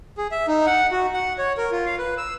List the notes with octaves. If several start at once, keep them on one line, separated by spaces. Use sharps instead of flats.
G#4
E5
D#4
F#5
F#4
F#5
C#5
A#4
F4
F5
B4
E6